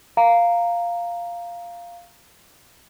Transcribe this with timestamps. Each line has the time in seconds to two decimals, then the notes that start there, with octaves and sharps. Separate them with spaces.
0.17 F5 A#5